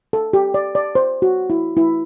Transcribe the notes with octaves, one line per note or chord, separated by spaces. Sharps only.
A4
G4
D5
D5
C5
F#4
E4
E4